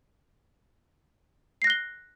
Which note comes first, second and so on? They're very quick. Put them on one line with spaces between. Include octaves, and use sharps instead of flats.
C7 A#6 F#6 G7